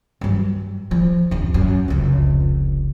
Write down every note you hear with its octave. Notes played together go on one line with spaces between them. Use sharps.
G2 F#3
F3
D1 F2
F#2
F1 C#2